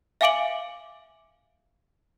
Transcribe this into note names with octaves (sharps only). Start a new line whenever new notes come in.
E5 F5 G#5 D6 D7 F#7